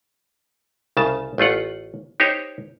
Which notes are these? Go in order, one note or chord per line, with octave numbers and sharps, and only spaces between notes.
C2 C#3 A5
A1 A3 F4 F#5
D#4 G4 C5 C#5